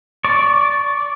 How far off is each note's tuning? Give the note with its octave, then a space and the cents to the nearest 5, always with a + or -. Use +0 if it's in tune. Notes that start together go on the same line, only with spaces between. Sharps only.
D5 -15 C#6 +0